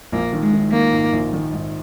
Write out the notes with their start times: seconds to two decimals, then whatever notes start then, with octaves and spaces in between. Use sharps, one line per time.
0.12 A#1 A#3
0.33 D#3
0.42 G#3
0.53 D#3
0.72 D#3 A#3
0.93 G#2
1.13 A#1
1.33 D#3
1.53 G#2